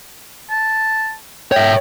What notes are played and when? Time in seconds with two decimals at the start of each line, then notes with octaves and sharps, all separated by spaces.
0.50 A5
1.52 C#5 E5 G5